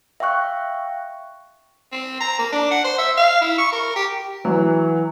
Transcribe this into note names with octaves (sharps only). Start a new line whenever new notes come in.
E5 F5 G5 C#6 F#6
C4
A#5
A#3
D4
F#5
C5
E5
F5
E4
C#6
A#4
G4
E3 F#3